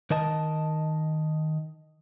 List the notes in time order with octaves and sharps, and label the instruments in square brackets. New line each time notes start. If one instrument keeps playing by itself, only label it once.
[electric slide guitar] D#3 A#4 D#5 A5